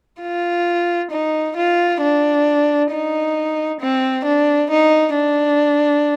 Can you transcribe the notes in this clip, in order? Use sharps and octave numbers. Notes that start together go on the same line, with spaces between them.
F4
D#4
F4
D4
D#4
C4
D4
D#4
D4